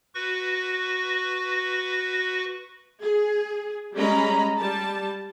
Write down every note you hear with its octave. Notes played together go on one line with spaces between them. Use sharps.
F#4 B4 C#6 A#6
G#4
G3 G#3 C#4 D#5 A#5 B5
G3 A5